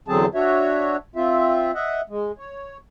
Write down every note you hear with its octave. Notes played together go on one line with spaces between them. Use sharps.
E2 D3 F#3 C4 G#4 A5
D4 F#4 C#5 E5
C4 F4 E5
D#5 E5 F#5
G#3
C#5